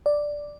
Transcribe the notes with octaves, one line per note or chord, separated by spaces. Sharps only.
D5